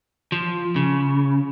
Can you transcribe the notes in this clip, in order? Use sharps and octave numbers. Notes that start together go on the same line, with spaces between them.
F3
C#3